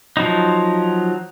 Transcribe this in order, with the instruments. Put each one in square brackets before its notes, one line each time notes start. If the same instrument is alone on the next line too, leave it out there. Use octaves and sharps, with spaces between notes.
[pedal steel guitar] F3 F#3 D#4